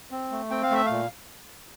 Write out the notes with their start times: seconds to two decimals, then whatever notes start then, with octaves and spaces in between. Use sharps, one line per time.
0.11 C4
0.31 A3
0.51 C4 G5
0.63 F5
0.71 A3 E5
0.86 A#2 F5